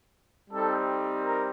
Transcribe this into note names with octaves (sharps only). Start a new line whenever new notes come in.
G3 C4 D#4 A4
A#4